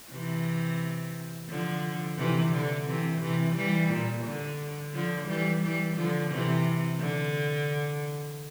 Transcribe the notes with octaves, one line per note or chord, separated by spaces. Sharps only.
C3 E3
D3 F3
C3 E3
D3
C3 E3
C3 E3
E3 G3
A#2
D3
D3 F3
E3 G3
E3 G3
D3 F3
C3 E3
D3